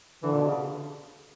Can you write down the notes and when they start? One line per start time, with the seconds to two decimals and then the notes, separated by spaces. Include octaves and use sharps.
0.23 D3 E3
0.32 A#2
0.40 B2
0.48 C#3